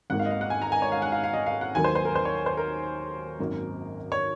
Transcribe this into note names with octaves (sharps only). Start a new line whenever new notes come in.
G#1 G#2 D#3 A#3 F#5
F5
D#5
F5
F#5
G#5
A#5
G#5
C#5
F5
F#5
F5
F5
D#5
F5
F#5
D#2 D#3 F#3 A#3 G#5
C5
C5
A#4
C5
C#5
C5
A#4
G#1 F#2 D#3 A#3 C#4
C#5